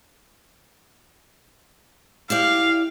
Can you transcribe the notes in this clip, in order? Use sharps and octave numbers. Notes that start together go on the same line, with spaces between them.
E4 G4 D5 F5